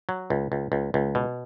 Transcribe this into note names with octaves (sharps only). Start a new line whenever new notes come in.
F#3
C#2
C#2
C#2
C#2
B2